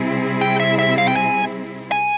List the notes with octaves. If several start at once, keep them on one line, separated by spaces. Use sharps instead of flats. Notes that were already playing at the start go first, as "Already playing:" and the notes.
Already playing: C3 G3 C4 E4 G#4
G5
E5
E5
F5
G5
G#5
G#5